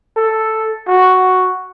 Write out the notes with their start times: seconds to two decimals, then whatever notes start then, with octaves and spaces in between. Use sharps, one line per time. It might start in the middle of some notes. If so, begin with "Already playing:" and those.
0.17 A4
0.87 F#4